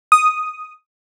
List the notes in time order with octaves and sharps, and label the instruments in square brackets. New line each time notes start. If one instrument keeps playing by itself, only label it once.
[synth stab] D#6